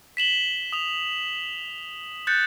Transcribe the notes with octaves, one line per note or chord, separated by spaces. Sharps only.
B6 E7 F#7 G7
D#6 F7
F#6 G6 A6 C#7